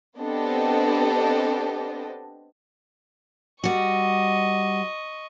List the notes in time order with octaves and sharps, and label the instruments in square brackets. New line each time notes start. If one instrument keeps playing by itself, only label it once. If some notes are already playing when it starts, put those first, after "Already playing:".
[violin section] B3 C4 D4 G4 A4 D#5
[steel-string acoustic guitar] G3 F#4 [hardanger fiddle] D#5 C#6